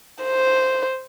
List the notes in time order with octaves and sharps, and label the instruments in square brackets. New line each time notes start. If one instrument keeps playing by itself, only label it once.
[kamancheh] C5